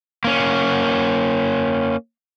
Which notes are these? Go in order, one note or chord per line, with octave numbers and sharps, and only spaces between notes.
A#3 C#4